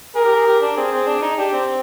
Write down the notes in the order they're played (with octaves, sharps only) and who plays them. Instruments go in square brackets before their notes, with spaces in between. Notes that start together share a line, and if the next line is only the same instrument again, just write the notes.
[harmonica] G#4 [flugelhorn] A#4
[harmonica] G4
G#4
G4
D4
[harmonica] C4 [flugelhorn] G#4
[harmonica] C4
D4
D#4
[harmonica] D4 [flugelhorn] G4
[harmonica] C4